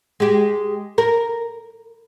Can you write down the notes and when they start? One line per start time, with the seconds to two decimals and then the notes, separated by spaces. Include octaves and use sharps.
0.20 G#3 G4
0.98 A#4